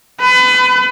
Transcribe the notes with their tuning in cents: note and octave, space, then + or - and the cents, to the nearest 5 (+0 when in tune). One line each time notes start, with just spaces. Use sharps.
B4 +30